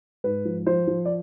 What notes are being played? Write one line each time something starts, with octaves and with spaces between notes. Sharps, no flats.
G#2 B4
F3
F3 C5
F3
D5